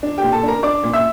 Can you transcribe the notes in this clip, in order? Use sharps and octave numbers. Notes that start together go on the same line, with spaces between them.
D4
A#2 G4 G5
A4 A5
D4 A#4 A#5
D4 D5 D6
A#2
E5 E6